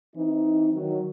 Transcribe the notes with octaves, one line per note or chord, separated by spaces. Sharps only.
E3 C4 D#4
D#3 F#3